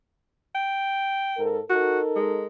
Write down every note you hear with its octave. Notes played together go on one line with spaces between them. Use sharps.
G5
G#2 A4 A#4
D#4 F#4 A4 A#4
G#3